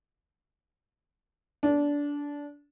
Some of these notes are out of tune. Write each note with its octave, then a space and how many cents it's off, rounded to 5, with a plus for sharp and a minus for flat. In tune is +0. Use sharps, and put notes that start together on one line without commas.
D4 -20